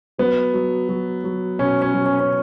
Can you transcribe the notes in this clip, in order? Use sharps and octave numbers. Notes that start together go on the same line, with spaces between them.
F#3 B3
F#3
F#3
F#3
B2 C#4
C#4
F#3
C#4
C#4